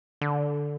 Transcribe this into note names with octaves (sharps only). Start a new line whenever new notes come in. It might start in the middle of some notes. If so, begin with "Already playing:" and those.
D3